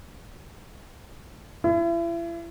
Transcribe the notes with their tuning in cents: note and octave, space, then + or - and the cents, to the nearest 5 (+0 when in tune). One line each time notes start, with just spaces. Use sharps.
E4 +40